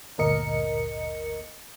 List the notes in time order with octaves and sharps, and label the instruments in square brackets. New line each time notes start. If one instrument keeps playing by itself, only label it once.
[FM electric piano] G1 D2 A#2 A#4 D#5 C#7